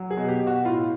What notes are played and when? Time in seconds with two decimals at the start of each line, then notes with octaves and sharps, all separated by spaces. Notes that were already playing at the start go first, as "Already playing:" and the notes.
Already playing: F#3
0.10 G#4
0.17 B2
0.28 G4
0.41 B2
0.47 F#4
0.65 A2 F4